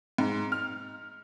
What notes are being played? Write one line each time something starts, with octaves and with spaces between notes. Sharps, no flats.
G#2
F6